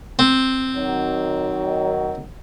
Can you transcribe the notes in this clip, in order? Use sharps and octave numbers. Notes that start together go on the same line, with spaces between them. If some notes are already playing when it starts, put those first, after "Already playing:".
C4
D#3 F#3